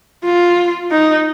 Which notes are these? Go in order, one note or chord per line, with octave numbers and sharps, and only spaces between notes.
F4
D#4